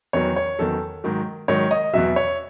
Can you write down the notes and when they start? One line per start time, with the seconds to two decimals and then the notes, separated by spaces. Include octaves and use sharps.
0.13 E2 D#3 F#3 C#5
0.36 C#5
0.59 E2 D#3 F#3 A4
1.04 G#2 D#3 F#3
1.48 G#2 D#3 F#3 C#5
1.71 D#5
1.94 E2 B2 F#3 E5
2.16 C#5